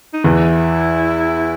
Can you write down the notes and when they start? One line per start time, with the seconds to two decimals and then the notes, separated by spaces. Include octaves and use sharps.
0.13 D#4
0.24 E2 E3 E4